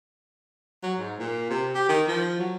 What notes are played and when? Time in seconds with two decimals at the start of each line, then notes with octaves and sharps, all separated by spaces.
0.83 F#3
0.99 G#2
1.19 A#2
1.50 C3
1.75 G4
1.89 D#3
2.08 F3
2.39 F#3